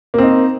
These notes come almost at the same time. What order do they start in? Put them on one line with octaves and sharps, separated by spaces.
A#3 C4 D#4